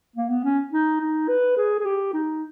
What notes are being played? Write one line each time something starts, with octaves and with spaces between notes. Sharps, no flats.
A#3
B3
C#4
D#4
D#4
B4
G#4
G#4
G4
D#4